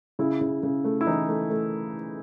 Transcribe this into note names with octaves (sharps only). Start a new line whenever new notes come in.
C#3 E4
C#3
C#3
A3
E4
E3 D#4
A3
A3